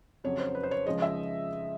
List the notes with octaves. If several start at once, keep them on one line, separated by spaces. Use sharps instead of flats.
F2 C#3 F#3 C#5
C5
B4
C5
C#5
C#2 C#3 F3 G#3 D#5
E5